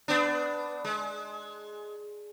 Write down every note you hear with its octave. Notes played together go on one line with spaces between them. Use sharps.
B3 D4
G#3